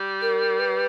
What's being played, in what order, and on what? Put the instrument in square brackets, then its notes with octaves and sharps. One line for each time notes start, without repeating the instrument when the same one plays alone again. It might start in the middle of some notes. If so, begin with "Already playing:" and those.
Already playing: [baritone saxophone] G3
[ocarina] A#4
B4